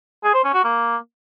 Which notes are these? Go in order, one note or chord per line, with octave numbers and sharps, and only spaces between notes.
G#4
C5
C#4
F#4
A#3